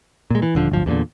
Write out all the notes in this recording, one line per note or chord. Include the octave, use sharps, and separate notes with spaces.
A#2 G#3
E3
D#1 D3 F3
D1 G1 F3
E2 G2 A#2 D3